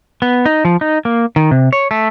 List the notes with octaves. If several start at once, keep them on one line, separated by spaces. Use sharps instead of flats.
B3
D#4
F3
D#4
A#3
D#3
C3
C#5
A3